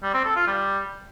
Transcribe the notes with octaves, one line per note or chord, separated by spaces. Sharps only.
G3
C4
A4
F4
G3